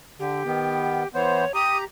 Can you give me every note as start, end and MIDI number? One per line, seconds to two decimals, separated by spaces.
0.20 0.43 50
0.20 1.08 67
0.46 1.03 51
0.46 1.03 59
1.14 1.45 52
1.14 1.45 59
1.14 1.45 72
1.14 1.52 73
1.54 1.84 67
1.54 1.84 82
1.54 1.77 87